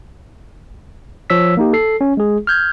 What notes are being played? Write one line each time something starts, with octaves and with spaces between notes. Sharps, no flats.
F3 C#5 E6 B6
A#3 D#4 G4
A4 C7
C#4
G#3 G#4
F6 G6 G#6